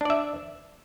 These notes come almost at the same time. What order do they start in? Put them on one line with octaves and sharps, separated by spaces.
D4 D5 E5